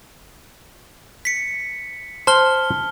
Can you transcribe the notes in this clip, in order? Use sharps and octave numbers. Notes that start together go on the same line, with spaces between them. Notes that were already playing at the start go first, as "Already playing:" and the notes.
B6 C#7
C5 A5 F6 G7